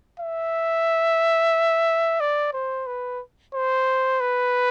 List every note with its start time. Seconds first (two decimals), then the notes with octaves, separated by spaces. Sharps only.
0.20 E5
2.20 D5
2.53 C5
2.86 B4
3.54 C5
4.20 B4